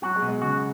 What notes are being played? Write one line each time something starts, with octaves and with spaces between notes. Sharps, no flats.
F#3 F#4
G#3
B2
G#3
C#3 F#4